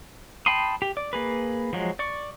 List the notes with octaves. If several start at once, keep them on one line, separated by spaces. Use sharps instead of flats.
G5 A5 B5 C6 D#6
G4
D5
A#3 G#4 B4
F3 F#3 G#3
D5 C#6